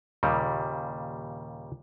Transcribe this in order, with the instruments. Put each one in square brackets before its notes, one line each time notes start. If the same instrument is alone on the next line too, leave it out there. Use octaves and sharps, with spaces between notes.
[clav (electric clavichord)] D#2 A#2 C#3 G3